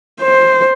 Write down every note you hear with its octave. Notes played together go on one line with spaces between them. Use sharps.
C5